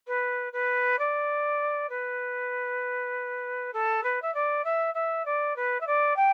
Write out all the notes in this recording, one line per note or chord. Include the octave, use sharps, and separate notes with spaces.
B4
B4
D5
B4
A4
B4
E5
D5
E5
E5
D5
B4
E5
D5
G5